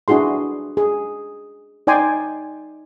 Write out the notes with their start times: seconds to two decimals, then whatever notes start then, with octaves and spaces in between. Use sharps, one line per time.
0.08 D4 E4 F#4 G#4 C6
0.77 G#4
1.87 D#4 D5 G5 G#5 C6